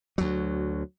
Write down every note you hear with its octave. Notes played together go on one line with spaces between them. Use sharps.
D2 F#3